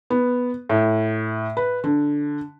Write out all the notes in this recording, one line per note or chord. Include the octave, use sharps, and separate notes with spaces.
B3
A2
B4
D3